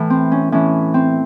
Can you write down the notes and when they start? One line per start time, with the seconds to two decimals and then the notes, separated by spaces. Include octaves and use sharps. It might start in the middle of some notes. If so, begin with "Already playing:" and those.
Already playing: A2 E3
0.10 C4
0.32 C#4
0.52 A2 E3 C#4
0.94 C4